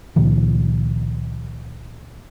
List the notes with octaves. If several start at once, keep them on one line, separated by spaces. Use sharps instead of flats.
C#2 A#2 D#3 F3